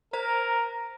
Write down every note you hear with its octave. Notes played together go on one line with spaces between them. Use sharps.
A#4 C5 A#5